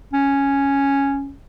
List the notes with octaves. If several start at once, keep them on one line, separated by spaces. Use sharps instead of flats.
C#4